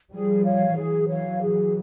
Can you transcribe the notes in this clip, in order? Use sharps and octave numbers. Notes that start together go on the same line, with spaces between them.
F3 G3 G#4
C#5 F5
E3 F#3 G#4
C#5 F5
G#4